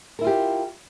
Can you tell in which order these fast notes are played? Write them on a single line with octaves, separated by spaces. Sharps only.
A#4 E4 F4 G4